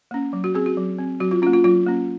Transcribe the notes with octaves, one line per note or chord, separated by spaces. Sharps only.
A#3 C#4
F#3
F#4
C4 G#4
F#4
F#3
C4
F#3 F#4
F4
A#3 C#4 F4
F4
F#3 F4
A#3 C#4